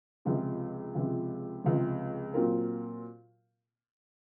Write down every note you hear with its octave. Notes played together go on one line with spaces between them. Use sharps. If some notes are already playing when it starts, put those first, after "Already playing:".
C#2 C3 F3 G#3
C#2 C3 F3 G#3
C#2 C3 F3 G#3
A#2 F#3 C4 F4 A#4